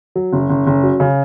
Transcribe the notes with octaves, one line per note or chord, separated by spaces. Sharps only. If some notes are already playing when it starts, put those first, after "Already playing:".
F#3
F#1
F#1
F#1
F#3
C#3